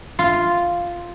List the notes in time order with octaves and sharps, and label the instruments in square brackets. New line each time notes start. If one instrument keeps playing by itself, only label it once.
[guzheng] F4